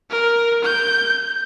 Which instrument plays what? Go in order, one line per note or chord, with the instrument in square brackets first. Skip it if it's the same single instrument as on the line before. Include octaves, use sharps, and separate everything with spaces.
[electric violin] A#4
G6